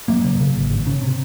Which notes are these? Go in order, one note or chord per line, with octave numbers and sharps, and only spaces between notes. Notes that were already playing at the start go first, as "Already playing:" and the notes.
F#2 F#3 A#3
C#3
C#3
G#1
G#1
C#3
C3